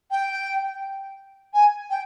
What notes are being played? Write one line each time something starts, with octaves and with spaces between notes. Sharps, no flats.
G5
G#5
G5